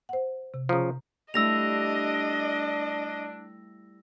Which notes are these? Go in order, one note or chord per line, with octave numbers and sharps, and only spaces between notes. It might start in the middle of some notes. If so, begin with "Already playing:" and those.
C5 F#5
C3
C#3 F3 A#5 D#6
G3 A3 D4 E4 D#5 E6 A#6 F7